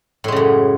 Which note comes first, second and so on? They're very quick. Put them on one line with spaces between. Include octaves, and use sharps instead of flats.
A2 G#3 C#3 F#2